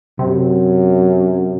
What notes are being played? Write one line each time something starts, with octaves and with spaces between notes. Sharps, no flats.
F#2 C3